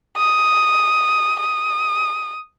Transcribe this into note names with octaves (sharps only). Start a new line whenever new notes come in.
D#6
D#6